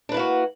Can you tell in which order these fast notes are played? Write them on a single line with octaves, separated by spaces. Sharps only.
D4 B4 E4 A#3 F#4